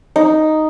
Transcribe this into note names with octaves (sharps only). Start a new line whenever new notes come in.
D#4